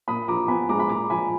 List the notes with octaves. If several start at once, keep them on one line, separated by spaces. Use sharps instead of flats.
A#2 B5 D#6
F3 A#5 D6
B3 G#5 B5
G#3 A#5 D6
B5
A#2 A#5 D6
F3 G#5 B5